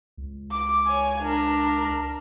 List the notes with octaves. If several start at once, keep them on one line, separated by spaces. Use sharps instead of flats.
C#2
D6
C#5 G#5
D4 A#4